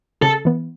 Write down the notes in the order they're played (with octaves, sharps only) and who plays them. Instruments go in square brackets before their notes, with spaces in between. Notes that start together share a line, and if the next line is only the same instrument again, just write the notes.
[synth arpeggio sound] C#3 [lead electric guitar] A4
[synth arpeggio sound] E3 B3